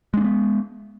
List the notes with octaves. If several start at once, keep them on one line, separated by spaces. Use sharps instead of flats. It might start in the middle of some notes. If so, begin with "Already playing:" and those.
G#3 A#3 B3 D4